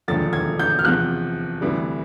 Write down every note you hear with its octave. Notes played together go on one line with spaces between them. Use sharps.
E1 D#2 D3 F3 A6
G#6
G6
F6
E2 C3 F3 F#6
D2 C3 E3 G3